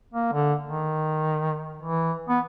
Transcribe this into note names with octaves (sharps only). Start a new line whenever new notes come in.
A#3
D3
D#3
E3
B3